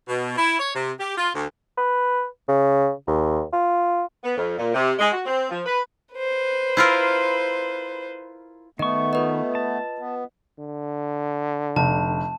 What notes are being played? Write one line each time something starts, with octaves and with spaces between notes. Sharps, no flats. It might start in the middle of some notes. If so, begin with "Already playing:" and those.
B2
E4
C#5
C3
G4
F4
D2
B4
C#3
D#2
F4
B3
F2
A#2
C3
G#3
F#4
C4
F3
B4
B4 C5
E4 F4 A#4
D#3 A3 B3 D#5 C#6
F4 B4 D#5
A5
B3
D3
F1 A5